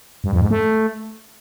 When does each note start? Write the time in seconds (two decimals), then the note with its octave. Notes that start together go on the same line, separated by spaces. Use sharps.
0.24 G2
0.33 F2
0.42 G#2
0.51 A3